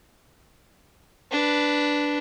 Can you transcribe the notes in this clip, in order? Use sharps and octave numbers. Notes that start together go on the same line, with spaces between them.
D4 B4